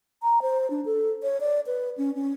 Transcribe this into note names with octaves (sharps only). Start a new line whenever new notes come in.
A#5
C5
D4
A4
C#5
D5
B4
C#4
C#4